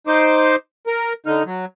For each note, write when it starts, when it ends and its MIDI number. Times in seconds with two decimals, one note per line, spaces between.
0.07 0.56 63
0.07 0.56 72
0.07 0.56 86
0.87 1.13 70
1.26 1.43 50
1.26 1.43 63
1.26 1.43 89
1.46 1.65 54